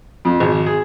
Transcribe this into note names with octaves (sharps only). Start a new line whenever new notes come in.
F2
G#1
G#4